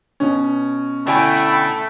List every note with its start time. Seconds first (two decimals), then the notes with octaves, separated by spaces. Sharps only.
0.20 B2 C#4
1.07 D3 A3 E4 G5 G#5 B5